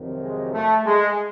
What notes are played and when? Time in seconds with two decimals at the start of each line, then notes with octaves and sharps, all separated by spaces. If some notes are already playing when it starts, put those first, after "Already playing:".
Already playing: F2 C3 D#3 F#3
0.22 G#3
0.53 A3
0.85 G#3